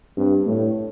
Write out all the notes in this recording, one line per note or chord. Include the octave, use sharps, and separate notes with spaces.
G2 C4
A2 A3